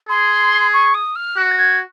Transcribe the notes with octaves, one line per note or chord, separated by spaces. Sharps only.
G#4 C6
C#6
D#6
F6
F#4 F#6
A#6
G#6